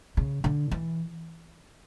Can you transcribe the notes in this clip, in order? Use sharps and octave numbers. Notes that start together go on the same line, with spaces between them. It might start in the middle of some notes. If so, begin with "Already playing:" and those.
C#3
D3
E3